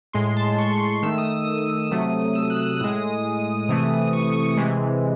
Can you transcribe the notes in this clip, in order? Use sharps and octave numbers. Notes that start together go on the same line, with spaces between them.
A2 G#3 C6
C6
A5
C6
C#6
D#3 A3 E6
D#6
D#6
C3 F#3 A3
E6
F#6
E6
A2 G#3 D#6
C3 E3 A3
C#6
C3 E3 G#3